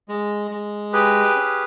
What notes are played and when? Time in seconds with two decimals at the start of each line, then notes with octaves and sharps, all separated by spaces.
0.09 G#3
0.51 G#3
0.93 G4 G#4 B4
1.36 C#4